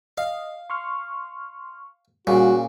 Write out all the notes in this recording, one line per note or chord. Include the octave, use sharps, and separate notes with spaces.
D#5 F5
C6 C#6 F6
A#2 C#3 G3 F#4